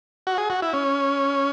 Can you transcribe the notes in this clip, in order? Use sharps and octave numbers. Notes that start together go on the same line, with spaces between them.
F#4
G#4
F#4
E4
C#4